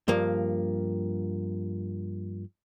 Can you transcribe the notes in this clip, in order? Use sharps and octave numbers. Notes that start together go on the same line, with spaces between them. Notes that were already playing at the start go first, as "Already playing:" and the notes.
G2 F3 A#3